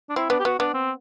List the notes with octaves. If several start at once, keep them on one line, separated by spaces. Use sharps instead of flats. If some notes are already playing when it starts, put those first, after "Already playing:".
D4
C4 E4
B3 D4
G4
B3 F#4
B3 D4
C4